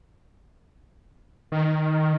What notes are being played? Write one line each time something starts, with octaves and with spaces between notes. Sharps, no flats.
D#3